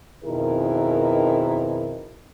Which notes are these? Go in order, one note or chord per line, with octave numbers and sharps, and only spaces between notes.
F2 B2 D#3 E4 G#4 A#4